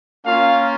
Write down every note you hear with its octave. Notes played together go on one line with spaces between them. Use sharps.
A#3 C#4 F4 F5